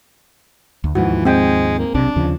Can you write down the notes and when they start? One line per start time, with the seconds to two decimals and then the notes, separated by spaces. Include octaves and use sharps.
0.84 D2
0.95 D#2 G#2 E3 F3 F#4
1.25 G#3 C4 G5
1.79 A#3
1.94 B1 C3 D4
2.16 D#2 C#3 F3